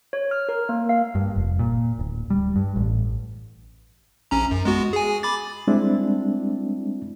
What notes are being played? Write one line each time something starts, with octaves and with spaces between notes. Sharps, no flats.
C#5
F6
A#4
A#3
F5
G2
F1
A#2
D1
G3
G2
A1
A#1 C#4 A#5
F#2
G#3 B3 F#4
G#4 G#5
B5 D6 A6
G3 G#3 C4 D4 E4